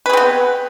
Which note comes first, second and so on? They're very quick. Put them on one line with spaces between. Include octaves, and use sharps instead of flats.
B4 G#4 C4 B3